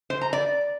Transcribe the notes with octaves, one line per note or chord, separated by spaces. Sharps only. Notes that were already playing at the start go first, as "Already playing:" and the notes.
C5
A#5
D5